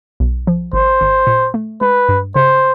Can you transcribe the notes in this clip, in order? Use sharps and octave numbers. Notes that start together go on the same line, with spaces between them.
B1
F3
G#1 C5
G#1
A#2
A3
G#3 B4
G2
C#3 C5